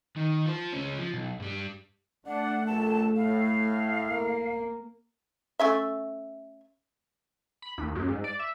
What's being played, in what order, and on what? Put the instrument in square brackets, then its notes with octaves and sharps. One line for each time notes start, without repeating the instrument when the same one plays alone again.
[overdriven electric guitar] D#3
F4 C5
C#2 C#4
F3
B1
G2 G3
[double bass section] A3 [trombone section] D4 [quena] F#5
[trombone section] A#1 A4 [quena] A5
[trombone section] A2 [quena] F5
[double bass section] A#3
[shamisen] A3 C#4 E5
[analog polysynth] B5
D#2
F#2
G#2
D5
E5